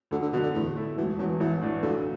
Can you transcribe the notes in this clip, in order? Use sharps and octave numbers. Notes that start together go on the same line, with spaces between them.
D2 D3
D3
B2 D3 F#3
D3
E2 A2
A3 E4
E1 E3
E2 E3 F#3
A1 E3
A2 E3 D4
B1 D3